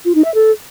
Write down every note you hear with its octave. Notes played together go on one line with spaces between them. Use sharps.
F4
D#4
E5
A4